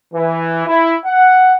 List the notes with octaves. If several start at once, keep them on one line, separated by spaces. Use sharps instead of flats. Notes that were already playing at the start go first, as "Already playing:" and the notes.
E3
E4
F#5